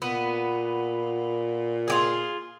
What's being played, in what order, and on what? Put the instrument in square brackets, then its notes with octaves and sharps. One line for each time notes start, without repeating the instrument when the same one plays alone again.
[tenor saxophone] A#2 [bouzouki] B3
[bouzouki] F4 G4 G#4